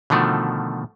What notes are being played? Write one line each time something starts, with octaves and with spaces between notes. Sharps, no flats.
B2 D3 D#3 F3 A3